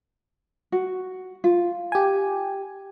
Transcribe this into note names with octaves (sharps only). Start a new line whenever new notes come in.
F#4
F4
G4 G#5